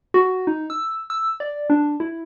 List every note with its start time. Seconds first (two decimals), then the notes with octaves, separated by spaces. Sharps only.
0.14 F#4
0.47 D#4
0.70 E6
1.10 E6
1.40 D5
1.70 D4
2.00 E4